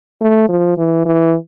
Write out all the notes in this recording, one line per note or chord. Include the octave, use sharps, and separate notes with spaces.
A3
F3
E3
E3